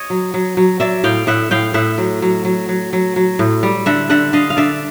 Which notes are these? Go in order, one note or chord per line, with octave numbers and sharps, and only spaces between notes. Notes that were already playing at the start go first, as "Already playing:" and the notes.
Already playing: C#5 D#5
F#3
F#3
F#3
F#3 D5 E5
A2 F5 G5
A2 E5 F#5
A2 F5 G5
A2 E5 F#5
F#3
F#3
F#3
F#3
F#3
F#3
A2
G3
D3 E5 F#5
D3 E5 F#5
D3 D#5 F5
F5
D3 D5 E5